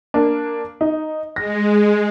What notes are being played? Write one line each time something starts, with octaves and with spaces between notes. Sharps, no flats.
A#3 D4
D#4
G#3 A#6